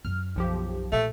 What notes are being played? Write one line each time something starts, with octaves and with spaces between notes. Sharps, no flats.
F#2 F#3 F6
B1 F3 G4
A#2 A3